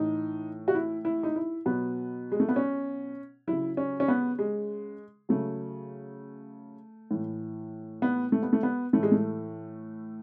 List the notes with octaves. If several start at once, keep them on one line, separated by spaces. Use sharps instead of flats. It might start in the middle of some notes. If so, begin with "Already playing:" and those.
Already playing: A2 E3 D#4
F#4
E4
E4
D#4
E4
B2 F#3 B3
G#3
A3
B3
C#4
C#3 F#3 E4
C#4
C#4
B3
G#3
C#3 F#3 A3
A2 E3
B3
A3
B3
A3
B3
A2 E3 A3
G#3
A3